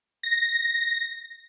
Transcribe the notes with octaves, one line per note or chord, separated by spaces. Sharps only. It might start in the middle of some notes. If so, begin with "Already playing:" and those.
A#6